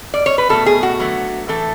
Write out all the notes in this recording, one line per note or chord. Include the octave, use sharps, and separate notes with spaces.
D5
C#5
B4
B2 A3 A4
G#4
F#4
D3 F#3 A3
A2 E3 A3 A4